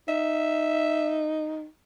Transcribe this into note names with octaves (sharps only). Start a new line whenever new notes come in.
D#4 E5